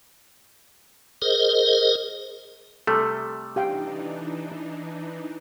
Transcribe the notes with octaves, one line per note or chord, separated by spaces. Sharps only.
G#4 A#4 C5 D#5
C3 G3 A3 A4
E3 D4 D#4 G4 F5 G5